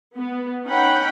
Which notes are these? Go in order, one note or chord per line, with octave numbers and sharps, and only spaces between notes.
B3
C#4 D#4 F#5 G5 B5